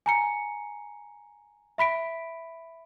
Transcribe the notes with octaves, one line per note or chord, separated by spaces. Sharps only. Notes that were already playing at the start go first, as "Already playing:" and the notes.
G#5 A#5 C#7
E5 B5 B6 D7